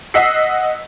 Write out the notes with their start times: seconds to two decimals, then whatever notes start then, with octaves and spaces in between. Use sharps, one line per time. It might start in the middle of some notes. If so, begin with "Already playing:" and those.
0.14 D#5 F#5 E6 B6 C7